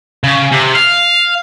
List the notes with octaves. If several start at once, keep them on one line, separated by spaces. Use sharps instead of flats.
C#3
C3
F5